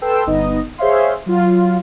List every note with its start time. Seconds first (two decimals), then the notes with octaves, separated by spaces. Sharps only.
0.02 A4 B4 G5 C6 E6
0.26 G1 B3 D#4 D#5
0.78 G#4 C5 C#5 E5 F5 C6
1.26 F#3 F4